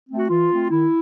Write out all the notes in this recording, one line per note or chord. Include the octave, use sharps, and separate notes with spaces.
A3 C4
F#4
E3 F4
A3 C4
D#3 E4